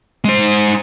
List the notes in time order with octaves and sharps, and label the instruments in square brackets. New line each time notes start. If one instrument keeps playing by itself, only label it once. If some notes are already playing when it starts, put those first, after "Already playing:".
[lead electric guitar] G#3 C5